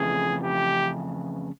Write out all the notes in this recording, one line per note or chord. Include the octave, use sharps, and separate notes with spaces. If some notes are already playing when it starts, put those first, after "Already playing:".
Already playing: F2 C#3 E3 A3 G#4
G4